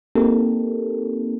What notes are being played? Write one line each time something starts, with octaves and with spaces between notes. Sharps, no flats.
A#3 C4 D#4 G4 A4 A#4